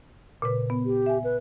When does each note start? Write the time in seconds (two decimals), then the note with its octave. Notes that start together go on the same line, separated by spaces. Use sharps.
0.42 A#2 C#3 B4
0.70 B3
0.86 G4
1.06 E5 G#5
1.24 B4